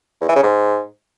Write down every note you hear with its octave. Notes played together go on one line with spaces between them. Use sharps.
E2
E3
C#3
G#2